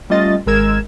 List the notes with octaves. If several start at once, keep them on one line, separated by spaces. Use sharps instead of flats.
G3 A3 C#4 F4 D#5 A6
G#1 G#3 A#4 E6 G#6 E7